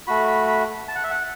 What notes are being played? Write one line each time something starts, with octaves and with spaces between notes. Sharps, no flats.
A3 F#4 B5
B5
B5
A5
F#5
E5
F#5